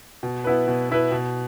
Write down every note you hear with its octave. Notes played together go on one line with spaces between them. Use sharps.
B2
B3 E4 B4
B2
B3 E4 B4
B2